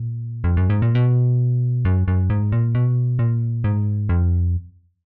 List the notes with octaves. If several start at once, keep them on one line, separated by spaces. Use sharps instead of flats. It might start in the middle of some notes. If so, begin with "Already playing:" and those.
Already playing: A#2
F2
F#2
G#2
A#2
B2
F#2
F#2
G#2
A#2
B2
A#2
G#2
F2